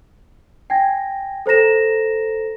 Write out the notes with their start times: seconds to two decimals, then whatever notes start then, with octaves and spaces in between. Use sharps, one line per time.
0.70 G5 G#5 G#6 A#6
1.46 A4 C5 A#5 A#6 E7